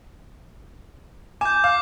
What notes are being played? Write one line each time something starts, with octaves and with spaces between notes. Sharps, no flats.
G#5 D6 G6
F5 D6